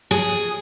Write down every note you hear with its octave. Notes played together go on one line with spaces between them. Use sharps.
G#4